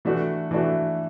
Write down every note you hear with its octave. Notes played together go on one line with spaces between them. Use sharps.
E3 A3 D4 F#4
E3 A3 D4 F#4